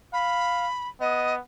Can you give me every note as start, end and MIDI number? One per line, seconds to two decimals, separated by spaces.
0.13 0.67 77
0.13 0.89 83
1.00 1.40 59
1.00 1.34 75